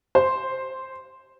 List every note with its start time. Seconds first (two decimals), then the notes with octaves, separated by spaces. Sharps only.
0.15 C5